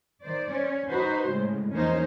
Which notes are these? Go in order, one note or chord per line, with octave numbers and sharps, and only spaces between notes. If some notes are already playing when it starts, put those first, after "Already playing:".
D#3 C5 D5
C#4
D#4 F#4 B4 C5
A2 C#3 G#3
E2 F3 A#3 C#4 D#4 C5